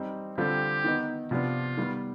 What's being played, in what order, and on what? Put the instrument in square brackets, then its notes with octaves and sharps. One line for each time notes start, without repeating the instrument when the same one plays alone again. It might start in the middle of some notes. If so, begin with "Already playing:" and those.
Already playing: [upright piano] G3 C4 D#4
[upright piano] D3 G3 C4 F4 [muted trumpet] G4
[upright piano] D#3 B3 D#4
[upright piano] C3 F3 B3 D4 [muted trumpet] F4
[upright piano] D#3 G3 B3